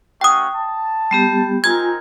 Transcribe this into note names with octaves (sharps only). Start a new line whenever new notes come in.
A3 C#4 F#4 G5 D#6
A5
G3 B3 G4
C4 D#4 F4 A#4 G#5 G#6